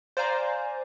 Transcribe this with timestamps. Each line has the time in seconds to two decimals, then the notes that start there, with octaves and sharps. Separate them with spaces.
0.17 C5 D5 F5 G#5 A#5